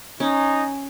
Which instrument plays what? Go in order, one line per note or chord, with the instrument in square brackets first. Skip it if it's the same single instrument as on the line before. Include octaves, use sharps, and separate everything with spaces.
[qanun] C#4 [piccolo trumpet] D#4